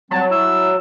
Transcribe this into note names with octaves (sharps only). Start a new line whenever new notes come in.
F#3 G3 C4 A5
E4 E6